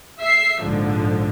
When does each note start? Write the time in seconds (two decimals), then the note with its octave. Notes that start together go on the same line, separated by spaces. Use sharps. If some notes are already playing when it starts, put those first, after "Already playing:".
0.20 E5 C7
0.62 A#1 G#2 D3 F3